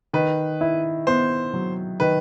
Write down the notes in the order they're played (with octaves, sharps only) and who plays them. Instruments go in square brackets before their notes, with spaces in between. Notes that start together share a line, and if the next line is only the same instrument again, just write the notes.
[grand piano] D#3 [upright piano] B4
[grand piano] E4
[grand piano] B3 [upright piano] C5
[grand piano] F#3
[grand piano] D#3 [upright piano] B4